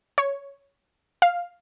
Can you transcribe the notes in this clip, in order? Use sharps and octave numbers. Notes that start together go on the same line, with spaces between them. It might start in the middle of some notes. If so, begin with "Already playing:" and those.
C#5
F5